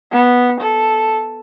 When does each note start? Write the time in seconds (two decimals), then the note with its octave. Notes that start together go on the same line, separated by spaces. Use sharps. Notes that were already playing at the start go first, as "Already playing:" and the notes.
0.11 B3
0.61 A4